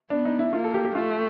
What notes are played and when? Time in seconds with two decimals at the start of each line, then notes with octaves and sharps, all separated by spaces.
0.10 B3 D4
0.25 D#4
0.39 E4
0.53 A#3 F4
0.64 A4
0.74 G4
0.85 G4
0.95 A3 F4